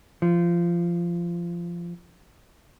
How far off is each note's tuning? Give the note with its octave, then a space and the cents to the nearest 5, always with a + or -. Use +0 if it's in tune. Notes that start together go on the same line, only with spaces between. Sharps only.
F3 -20